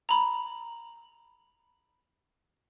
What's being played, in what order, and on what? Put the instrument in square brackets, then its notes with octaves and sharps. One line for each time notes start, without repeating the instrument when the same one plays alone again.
[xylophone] A#5 B5